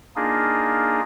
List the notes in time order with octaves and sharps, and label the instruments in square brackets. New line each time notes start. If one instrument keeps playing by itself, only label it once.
[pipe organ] A#3 D4 D#4 F4 G#4